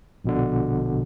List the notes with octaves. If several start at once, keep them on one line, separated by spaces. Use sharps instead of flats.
A#1 B2 D3